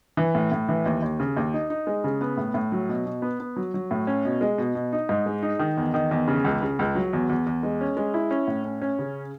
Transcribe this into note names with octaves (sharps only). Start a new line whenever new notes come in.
E3
A2
A2
E3
D#2
D#2
C#3
D#2
D#4
D#4
G#3
C#3
B3
A2
A2
F#3
B2
B2
B3
B3
F#3
F#3
A2
C#4
B2
G#3
B2
B2
D#4
G#2
G#3
D#4
D#3
E2
D#3
E2
C#3
C#2
C#3
C#2
F#3
E2
E2
E2
G#3
C#4
G#3
E4
C#4
A2
C#4
C#4
C#3